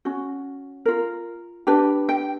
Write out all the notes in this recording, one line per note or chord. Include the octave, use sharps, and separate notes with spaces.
C#4 F#4
F4 A#4
D4 G4 B4
G5